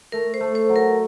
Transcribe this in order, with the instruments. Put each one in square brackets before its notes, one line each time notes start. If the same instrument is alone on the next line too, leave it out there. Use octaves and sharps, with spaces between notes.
[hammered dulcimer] A3 [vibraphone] A#4
[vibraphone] C5
[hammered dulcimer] A3
[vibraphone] C5
[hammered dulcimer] F#3
[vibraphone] A#4